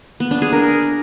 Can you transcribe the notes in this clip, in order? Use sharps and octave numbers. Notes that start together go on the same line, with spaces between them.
B3
D4
G#4
A#4